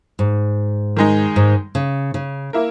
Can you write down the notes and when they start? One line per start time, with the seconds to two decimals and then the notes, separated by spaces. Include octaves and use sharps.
0.19 G#2
0.97 D#3 G#3 D#4
1.36 G#2
1.75 C#3
2.14 C#3
2.53 A#3 E4 A#4